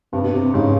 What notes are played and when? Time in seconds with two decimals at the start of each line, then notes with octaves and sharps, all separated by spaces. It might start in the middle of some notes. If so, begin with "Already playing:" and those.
0.12 G2 C3
0.23 B2
0.33 C3
0.54 G#2 C#3